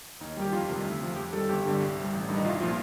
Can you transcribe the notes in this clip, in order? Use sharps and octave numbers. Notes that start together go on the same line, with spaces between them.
D#2 D#4
D#3 G3 G4
F2 F4
C3 D#3 G3
D2
C3 F3
F2 G4
D#3 G3 A4
G1 G4
G2 D3 G3
C2
C3 G3
A1
G2 D#3 G3
D#4
C2 F4
A#2 F3 F4